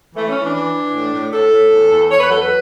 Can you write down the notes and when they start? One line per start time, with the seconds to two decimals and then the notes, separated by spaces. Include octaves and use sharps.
0.15 E3 A3
0.28 C#4
0.34 E3
0.42 D4
0.54 E3
0.74 E3
0.93 A2
1.13 A2
1.33 A2 A4
1.52 A2
1.71 E2
1.91 E2
2.10 E2 C#5
2.20 B4
2.29 F#3 A4
2.38 B4